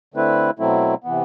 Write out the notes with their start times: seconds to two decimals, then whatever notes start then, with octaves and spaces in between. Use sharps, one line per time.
0.14 D3 A3 C4 E4 B4
0.59 B2 F#3 A3 C4 E4
1.04 C3 E3 B3